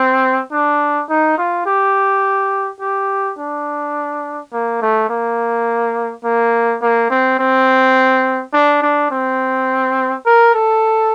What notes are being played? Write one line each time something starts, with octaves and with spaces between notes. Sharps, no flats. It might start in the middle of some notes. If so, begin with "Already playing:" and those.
Already playing: C4
D4
D#4
F4
G4
G4
D4
A#3
A3
A#3
A#3
A#3
C4
C4
D4
D4
C4
A#4
A4